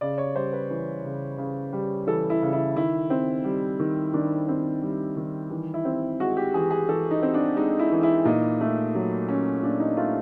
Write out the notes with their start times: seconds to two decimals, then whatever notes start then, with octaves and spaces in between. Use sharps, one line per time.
0.01 C#3 D5
0.18 C#5
0.35 G3 C5
0.53 B4
0.70 E3
1.04 C#3
1.38 C#3
1.73 G3
2.07 E3 A4
2.30 E4
2.42 C#3
2.53 E4
2.76 D#3 E4
3.10 C4
3.44 G3
3.80 D#3
4.13 D#3 D4
4.48 C4
4.82 G3
5.17 D#3
5.50 E3
5.74 E4
5.85 C4
6.20 G#3 F#4
6.37 G4
6.54 E3 G#4
6.71 G#4
6.89 E3 A4
7.11 D#4
7.23 C4
7.34 D4
7.57 G#3 D#4
7.79 E4
7.92 E3
8.03 E4
8.25 A#2 D#4
8.61 A3
8.95 F#3
9.29 C#4
9.63 A#2 D4
9.80 D#4
9.97 A3 F4